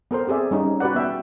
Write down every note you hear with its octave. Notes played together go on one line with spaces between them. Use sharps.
B3 A4 A#4 C5
C4 G4 G#4 D5 E5
G3 C#4 D#4
F#4 G4 B4 D5 F#5
B3 E5 G5 A5